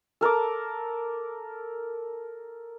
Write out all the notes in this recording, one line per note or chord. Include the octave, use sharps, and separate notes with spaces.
A4 A#4 A5 D6